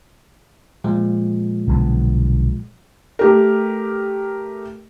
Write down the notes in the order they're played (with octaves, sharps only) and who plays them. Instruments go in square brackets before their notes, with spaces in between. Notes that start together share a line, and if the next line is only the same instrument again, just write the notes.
[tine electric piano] A#2 F3 G#3
[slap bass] B1 D3 B3
[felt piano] A3 G4 A#4